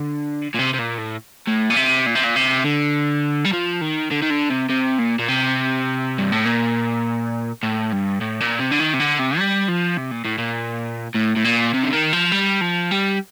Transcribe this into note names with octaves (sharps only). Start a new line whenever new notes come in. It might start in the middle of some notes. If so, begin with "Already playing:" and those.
Already playing: D3
A#2
C3
C3
A#2
A2
A2
A#2
C3
A#2
C3
A#2
C3
D3
G3
F3
D#3
D3
D#3
D3
C3
C3
A#2
A#2
C3
G2
A2
A#2
A2
G2
A2
A#2
C3
D3
D#3
C3
D3
C3
G3
F3
C3
A#2
A2
A#2
A2
A2
A#2
C3
D3
D#3
F3
G3
F3
G3